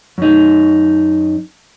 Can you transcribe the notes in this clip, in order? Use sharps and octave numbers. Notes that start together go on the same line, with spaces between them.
F#2 D#4